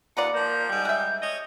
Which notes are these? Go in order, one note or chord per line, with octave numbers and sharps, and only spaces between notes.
D#2 F4 A#4 B4 D5 F#5 C#7
F3 A#3 G6
G#2 G3
G#3 E5
C#5 D#5